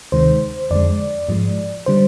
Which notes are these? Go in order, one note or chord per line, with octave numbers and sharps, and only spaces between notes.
D2 C3 D#3 G#3 C5
F2 D3 G#3 D5
G#2 F3 G#3
D3 G3 C5